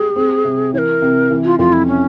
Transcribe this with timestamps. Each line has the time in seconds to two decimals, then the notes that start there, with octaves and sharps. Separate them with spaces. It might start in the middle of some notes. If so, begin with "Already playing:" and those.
Already playing: G4 G#4
0.16 C4
0.45 C3
0.73 E3 C#5
0.78 A#4
1.02 C3
1.31 E3
1.45 F4
1.59 F2 F4
1.73 E4
1.87 C#4